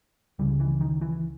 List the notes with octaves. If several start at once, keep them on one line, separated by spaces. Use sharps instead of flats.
C#2 C#3 G3
E3
D#3
E3